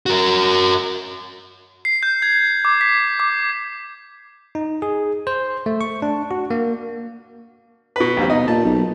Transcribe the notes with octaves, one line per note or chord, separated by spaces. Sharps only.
F#4 A#4
C7
G6
G#6
D6
B6
D6
D#4
G#4
C5
A3
C#6
D4
F#4
A#3
B2 B4
A#1 D#2 G3 C4
B2 D#4
A#2 A5
B1